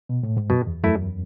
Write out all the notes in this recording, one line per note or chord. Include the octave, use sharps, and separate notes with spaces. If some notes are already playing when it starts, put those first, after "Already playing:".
B2
A2
G#2
F#2 B2
E2
F#2 A3 E4